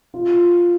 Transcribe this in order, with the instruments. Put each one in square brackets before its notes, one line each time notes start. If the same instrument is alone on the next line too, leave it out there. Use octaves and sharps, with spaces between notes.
[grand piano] F4